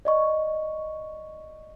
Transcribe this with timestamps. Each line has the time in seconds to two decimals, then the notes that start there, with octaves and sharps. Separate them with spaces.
0.05 D5 D#5 C#6